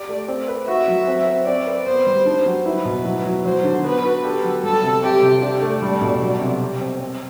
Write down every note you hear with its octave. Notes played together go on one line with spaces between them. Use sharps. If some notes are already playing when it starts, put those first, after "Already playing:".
Already playing: G4 D5
A3
C4
B4
F#4 E5
F#3
C4
C4
C4 D5
B4
B3 C5
G3
D4
F#3
E4 B4
B2
F#3
F#3
F#3 C5
D3
B3 B4
F#4
G4 A4
F#3
G3 A4
C3
C3 G4
C3
D4 G4
A3
G3
B2
F#3
C3
G4
C4
C4